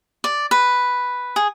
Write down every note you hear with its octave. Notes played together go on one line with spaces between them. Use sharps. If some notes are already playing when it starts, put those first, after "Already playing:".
D5
B4
G#4